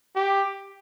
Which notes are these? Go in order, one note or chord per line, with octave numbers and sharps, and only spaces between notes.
G4